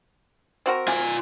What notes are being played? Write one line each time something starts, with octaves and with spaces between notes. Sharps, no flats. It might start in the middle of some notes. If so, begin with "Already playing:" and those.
C4 F#4 A#4
F4 G#5